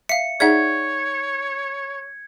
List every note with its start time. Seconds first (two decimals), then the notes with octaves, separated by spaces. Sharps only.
0.09 E5 F5 C#7
0.40 D#4 G#4 C#5 D5 E5 F#5 G#6